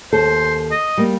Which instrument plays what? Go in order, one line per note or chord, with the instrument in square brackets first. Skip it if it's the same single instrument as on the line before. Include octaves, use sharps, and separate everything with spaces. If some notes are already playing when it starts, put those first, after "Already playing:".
[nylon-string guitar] D#2 A4 [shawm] C5
[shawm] D#5
[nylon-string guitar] G3 A#3